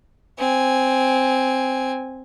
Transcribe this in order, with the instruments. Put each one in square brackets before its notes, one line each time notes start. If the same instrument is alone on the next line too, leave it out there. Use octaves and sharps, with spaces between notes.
[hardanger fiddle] C4 G#5